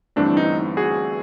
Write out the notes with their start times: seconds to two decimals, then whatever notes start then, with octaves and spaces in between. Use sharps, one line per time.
0.16 G1 G2 E3 A3 C4 D4
0.37 D#4
0.77 F#4 G#4